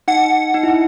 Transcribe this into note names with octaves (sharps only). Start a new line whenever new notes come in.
D#4 F#5
D#4
E4